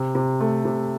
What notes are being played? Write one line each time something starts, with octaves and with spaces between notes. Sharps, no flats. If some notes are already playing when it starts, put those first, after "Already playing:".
Already playing: C3
C3
A3
C3